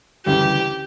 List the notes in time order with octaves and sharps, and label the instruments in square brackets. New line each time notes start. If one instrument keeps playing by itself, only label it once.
[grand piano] D2 C#3 E3 G3 [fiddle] G4